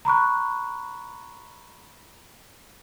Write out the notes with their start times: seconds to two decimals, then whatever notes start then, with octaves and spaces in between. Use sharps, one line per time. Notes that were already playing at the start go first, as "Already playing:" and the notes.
0.05 A#5 B5 C#6 F#6